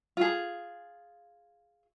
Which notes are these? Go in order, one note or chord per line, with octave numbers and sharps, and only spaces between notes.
F4 G#4